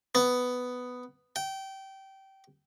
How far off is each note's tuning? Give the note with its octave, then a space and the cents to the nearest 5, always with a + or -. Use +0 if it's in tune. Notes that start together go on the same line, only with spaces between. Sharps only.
B3 +10
G5 -20